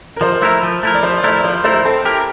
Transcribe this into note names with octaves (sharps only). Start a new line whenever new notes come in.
A#4
F3 C5
A3 E4 A#4
F3
A3 E4 A#4
D5
F3 C5
D5
A3 E4 A#4
D5
F3 C5
A3 E4 A#4 C5
C4 A4
E4 G4 A#4